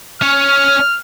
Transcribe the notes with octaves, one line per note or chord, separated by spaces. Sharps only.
C#4 C#5 F6